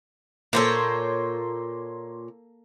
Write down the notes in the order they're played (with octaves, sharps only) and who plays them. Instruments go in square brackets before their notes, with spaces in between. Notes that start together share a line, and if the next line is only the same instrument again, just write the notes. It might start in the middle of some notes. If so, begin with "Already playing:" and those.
[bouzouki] A#2 C5 C#5 [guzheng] A#3 A4